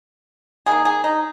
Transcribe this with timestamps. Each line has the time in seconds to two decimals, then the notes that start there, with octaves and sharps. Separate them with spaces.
0.66 D#3 A#3 G#4
0.85 G#4
1.04 D#4